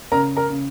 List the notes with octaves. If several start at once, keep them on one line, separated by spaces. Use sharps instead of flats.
C#3 A#4 A#5
A#4 A#5
C#3